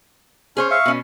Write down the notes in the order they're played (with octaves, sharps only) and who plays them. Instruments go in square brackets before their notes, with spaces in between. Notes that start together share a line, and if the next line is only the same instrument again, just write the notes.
[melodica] C#4 [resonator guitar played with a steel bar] G#4 C5 C#5
[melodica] E5 F5 C#6
[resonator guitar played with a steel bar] B2 C#4